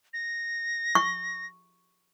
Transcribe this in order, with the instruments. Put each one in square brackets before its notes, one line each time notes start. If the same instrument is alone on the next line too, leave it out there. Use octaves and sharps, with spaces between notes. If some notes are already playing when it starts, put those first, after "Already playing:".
[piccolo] A#6
[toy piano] C#6